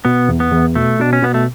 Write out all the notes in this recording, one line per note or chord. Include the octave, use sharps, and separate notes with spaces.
B2 B3
E2
B3
E2
B2 A3
B2 D4
C#4
B2 B3
A3